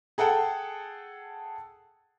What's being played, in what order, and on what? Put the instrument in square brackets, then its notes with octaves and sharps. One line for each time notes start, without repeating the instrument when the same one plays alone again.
[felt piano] G#4 A4 F#5 G5 A5